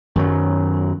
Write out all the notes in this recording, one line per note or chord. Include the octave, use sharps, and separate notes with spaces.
F#2 D#3 F#3